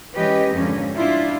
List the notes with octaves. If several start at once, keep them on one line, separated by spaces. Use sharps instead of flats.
E3 G#3 C#4 G4 B4 D#5
F2 G#2 D3 A#3 C#4
F#3 D4 E4 F4